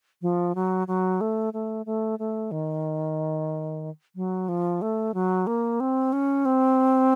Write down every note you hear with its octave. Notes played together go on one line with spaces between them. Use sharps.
F3
F#3
F#3
A3
A3
A3
A3
D#3
F#3
F3
A3
F#3
A#3
C4
C#4
C4